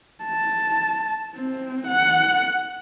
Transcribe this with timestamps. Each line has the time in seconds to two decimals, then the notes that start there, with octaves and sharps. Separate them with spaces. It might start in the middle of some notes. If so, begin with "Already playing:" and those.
0.24 A5
1.35 C4
1.88 F#5